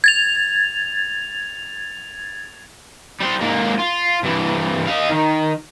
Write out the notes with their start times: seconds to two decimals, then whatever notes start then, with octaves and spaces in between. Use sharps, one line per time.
0.04 G#6 A6 F7
3.20 G3 C5
3.41 G#2 A#3
3.79 F4
4.23 G2 E3
4.87 D#5 F5
5.09 D#3